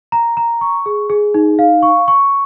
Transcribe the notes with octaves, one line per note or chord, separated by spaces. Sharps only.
A#5
A#5
C#6
G#4
G#4
D#4
F5
C#6
C#6